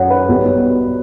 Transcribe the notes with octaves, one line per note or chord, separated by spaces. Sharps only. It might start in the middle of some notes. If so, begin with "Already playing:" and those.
Already playing: F#2 F#3 C#4 F#5
B4
B1 B2 G3 B3